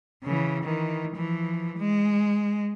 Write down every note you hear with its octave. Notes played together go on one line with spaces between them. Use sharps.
C#3 E3
D#3 E3
E3 F3
G#3